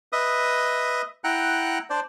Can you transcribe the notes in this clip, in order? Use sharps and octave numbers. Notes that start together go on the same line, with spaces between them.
B4 D#5 E5 D#6
E4 F#5 G5 A#5 F#6
D4 C5 D5